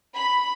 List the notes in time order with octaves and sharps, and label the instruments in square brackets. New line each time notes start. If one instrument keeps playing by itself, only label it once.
[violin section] B5